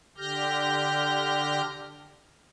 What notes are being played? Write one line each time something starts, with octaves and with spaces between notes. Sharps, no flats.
D3 G4 F6 G6 A#6